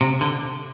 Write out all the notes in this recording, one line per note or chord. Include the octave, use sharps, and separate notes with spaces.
C3
D3